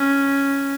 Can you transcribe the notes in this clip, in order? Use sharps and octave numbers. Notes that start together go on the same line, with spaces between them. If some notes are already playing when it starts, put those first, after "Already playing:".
Already playing: C#4